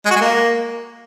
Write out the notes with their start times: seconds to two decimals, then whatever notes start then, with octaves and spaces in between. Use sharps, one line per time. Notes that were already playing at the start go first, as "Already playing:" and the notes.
0.05 G#3
0.11 F#4
0.16 G#3
0.21 A#3